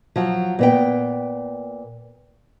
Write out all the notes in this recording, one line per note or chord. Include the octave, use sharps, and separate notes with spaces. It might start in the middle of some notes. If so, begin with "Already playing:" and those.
F3 F#3
A#2 B3 G5